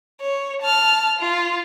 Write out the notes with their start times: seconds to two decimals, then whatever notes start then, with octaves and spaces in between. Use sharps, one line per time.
0.21 C#5
0.62 A5 F6
1.19 F4